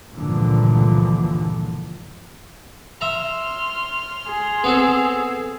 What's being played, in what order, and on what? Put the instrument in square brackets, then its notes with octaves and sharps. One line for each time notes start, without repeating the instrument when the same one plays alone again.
[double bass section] C#2 G2 A#2 D3 E3 F3
[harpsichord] E5 A#5 [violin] C6 F6
[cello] G#4
[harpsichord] B3 C4 A4